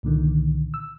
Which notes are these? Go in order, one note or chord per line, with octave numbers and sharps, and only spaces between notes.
C2 A#2 D3 D#3
E6